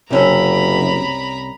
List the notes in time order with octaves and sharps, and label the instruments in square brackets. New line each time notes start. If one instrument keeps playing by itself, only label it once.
[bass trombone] F#1 [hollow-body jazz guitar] C2 C#4 A4 [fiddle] A#5 B5